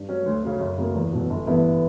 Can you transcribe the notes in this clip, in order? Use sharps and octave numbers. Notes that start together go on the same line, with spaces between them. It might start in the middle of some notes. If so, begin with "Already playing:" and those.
Already playing: G2
F#3 C#4
D2
C#3 F#3 C#4
F#2
C#3 F#3 A#3
E2
B2 F#3
G1
G2 E3 B3 E4